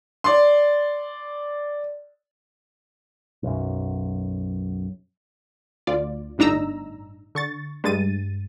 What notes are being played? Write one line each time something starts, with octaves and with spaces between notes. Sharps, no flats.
D5 C6
B1 F#2
D2 F4 D5
G1 A2 D4 D#4 A#5 E6
D3 C#6 A6
G2 G#3 A6 D#7